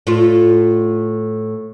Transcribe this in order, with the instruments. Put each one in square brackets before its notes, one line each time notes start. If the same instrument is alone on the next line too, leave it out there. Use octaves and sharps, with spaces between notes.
[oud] A2 F4